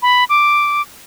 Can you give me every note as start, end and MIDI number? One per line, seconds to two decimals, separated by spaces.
0.02 0.24 83
0.29 0.82 86